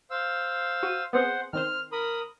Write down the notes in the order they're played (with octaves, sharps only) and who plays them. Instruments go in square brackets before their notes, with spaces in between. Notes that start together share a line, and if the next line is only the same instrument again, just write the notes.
[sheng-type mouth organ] C5 F5 E6
[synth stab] F#4 D#7
[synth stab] B3 C4 G#4 [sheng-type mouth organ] C5 F#5
[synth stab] D#3 C4 C5 [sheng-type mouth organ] F6
[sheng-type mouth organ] A#4 B5 D#6